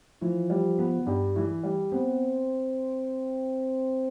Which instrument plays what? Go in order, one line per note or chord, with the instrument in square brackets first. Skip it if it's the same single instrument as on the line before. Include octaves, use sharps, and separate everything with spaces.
[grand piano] E3 [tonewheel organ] F3
[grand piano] G3
B3
[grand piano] G2 [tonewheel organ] G3
[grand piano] E3
G3
[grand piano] B3 [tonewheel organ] C4